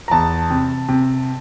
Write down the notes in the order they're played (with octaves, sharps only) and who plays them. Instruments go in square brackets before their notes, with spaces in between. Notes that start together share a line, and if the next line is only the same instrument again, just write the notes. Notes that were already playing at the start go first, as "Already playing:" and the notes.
[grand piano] A#5
E2 A5
C3
C3